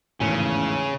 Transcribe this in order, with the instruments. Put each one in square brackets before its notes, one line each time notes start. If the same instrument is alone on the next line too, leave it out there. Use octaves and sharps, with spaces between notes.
[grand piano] G#1 E2 A2 [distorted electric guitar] C#3 C#4